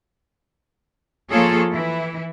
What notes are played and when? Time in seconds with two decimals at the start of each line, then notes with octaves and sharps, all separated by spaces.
1.30 F3 A#3 F4 G#4 A4 C#5
1.71 E3 E4